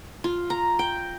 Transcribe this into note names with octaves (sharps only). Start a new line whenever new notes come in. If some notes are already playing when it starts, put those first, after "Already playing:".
F4
A#5
G5